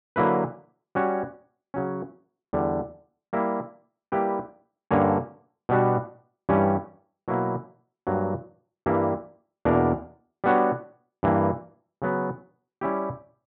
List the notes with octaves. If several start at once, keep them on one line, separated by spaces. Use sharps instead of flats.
D3 F#3 A#3 E4 B4
G3 C#4 F#4 C#5
C#3 F#3 C#4
E2 D3 G3
G3 A#3 E4
G3 A#3 E4 G4 B4
G2 D3 A#3 C#4
B2 G3 B3 D4 F#4
G2 E3 G3 C#4 G4
B2 F#3 A#3 E4
G2 F#3 A#3
G2 E3 G3 A#3 E4
E2 B2 A#3 D4 A#4
G3 B3 D4 F#4 C#5
G2 E3 A#3
C#3 F#3 B3
G3 C#4 E4 G4